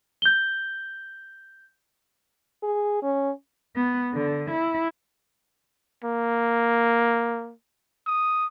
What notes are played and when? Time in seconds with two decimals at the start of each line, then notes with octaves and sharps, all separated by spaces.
0.22 G6 G7
2.63 G#4
3.03 C#4
3.76 B3
4.14 D3
4.51 E4
6.04 A#3
8.07 D#6